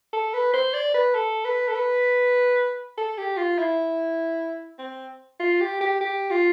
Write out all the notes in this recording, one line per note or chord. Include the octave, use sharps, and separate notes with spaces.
A4
B4
C5
D5
B4
A4
B4
A4
B4
A4
G4
F4
E4
C4
F4
G4
G4
G4
F4